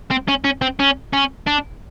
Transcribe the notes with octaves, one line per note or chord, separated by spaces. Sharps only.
C4
C#4
C#4
C4
C#4
C#4
D4